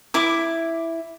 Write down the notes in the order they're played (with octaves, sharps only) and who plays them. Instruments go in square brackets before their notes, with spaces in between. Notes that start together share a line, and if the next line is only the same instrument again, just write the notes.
[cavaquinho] E4 D6